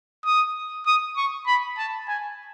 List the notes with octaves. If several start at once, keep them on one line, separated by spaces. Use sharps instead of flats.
D#6
D#6
C#6
B5
A5
G#5